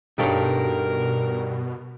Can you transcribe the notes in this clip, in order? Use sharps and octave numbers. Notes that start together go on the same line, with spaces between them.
G2 B2 D#4 A4 A#4 C#5 G5 B5